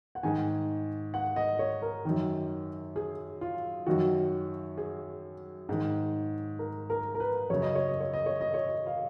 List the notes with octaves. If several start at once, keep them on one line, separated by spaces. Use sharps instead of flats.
F#5
G#2 D#3 G#5
F#5
D#5
C#5
A#4
F#2 D#3
G#4
F4
F#2 D#3 F#4
G#4
G#2 D#3
A#4
A#4
A#4
B4
F#2 C#3 C#5
D#5
C#5
D#5
C#5
D#5
C#5
D#5
C#5
D#5
F5